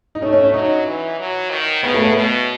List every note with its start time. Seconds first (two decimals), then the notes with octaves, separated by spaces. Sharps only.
0.15 D#4
0.21 A3 C#4
0.33 C#4
0.43 C#4
0.54 F#3 D#4
0.86 E3
1.19 F#3
1.51 D#3
1.83 C#3 B3
1.94 A3
2.05 B3
2.16 B2